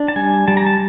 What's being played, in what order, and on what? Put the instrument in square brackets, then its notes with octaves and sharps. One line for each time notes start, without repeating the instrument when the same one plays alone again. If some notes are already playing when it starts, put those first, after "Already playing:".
Already playing: [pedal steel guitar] D4
A5
G3 G#5
G3 A5
A#5
A5